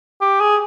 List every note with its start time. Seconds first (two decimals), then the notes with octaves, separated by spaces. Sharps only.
0.21 G4
0.40 G#4